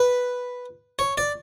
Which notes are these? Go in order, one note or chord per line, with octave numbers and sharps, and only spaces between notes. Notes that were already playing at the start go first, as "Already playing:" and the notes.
Already playing: B4
C#5
D5